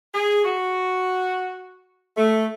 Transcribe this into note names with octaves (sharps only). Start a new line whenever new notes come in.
G#4
F#4
A3